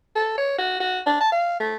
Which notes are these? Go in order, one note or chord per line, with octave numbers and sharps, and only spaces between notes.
A4
C#5
F#4
F#4
D4
A5
F5
A3